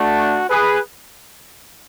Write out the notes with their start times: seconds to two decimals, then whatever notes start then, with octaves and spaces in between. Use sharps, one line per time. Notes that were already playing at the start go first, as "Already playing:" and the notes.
Already playing: A3 D4 F#4
0.49 G#4 B4